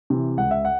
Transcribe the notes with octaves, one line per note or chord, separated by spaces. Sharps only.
C3 E3
C#2 F#5
E5
F#5